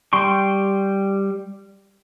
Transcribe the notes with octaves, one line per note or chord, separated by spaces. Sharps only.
G3 G5 C6 C#6